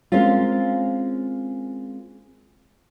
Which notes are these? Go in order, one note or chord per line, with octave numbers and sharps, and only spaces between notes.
G#3 A#3 C4 C#4 F4